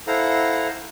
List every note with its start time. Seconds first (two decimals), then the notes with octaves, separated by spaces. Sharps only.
0.07 E4 A4 C5 F5 F#5 A#5